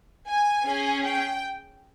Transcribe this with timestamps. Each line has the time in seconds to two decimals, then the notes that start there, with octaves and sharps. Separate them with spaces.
0.27 G#5
0.66 C#4 G#4
1.05 G5